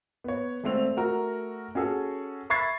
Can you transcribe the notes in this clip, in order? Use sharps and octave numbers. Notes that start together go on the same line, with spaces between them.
B3 C#5
G#1 A3 C4 F7
A3 F#4 A#4
C#4 F#4 G#4 A4
E5 B5 C#6 G#6 A6 C7